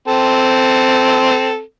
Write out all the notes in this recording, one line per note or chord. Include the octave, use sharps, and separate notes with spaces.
C4 A4